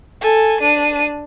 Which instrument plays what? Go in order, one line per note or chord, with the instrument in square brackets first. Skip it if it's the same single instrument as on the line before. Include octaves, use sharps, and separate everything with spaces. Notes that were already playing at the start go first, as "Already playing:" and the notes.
[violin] A4 G#5
D4 D#7